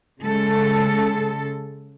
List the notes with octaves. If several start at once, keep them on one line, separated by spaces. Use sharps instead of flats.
C#3 G#3 A4